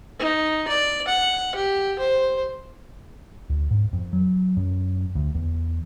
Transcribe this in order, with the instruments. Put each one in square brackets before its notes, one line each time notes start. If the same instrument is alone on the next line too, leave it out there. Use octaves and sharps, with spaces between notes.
[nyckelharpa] D#4
D5
F#5
G4
C5
[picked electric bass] D2
G#2
F2
F#3
F#2
D2
E2